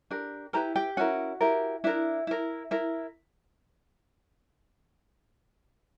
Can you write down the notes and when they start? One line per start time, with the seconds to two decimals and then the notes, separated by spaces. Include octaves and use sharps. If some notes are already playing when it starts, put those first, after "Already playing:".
0.10 D4 G4 A#4
0.53 E4 G4 A#4 B4 A#5
0.76 G4 G5
0.97 C#4 E4 F#4 A#4 F#5
1.41 E4 G4 A#4
1.84 D4 E4 A#4 E5
2.27 E4 A#4
2.71 E4 A#4